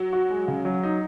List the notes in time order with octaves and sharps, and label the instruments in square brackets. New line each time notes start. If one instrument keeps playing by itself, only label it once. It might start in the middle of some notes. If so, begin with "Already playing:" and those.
Already playing: [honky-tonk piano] F#3
[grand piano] F#4
G#3
C#3
F#3
D#4